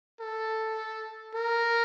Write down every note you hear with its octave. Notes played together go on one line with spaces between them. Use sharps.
A4
A#4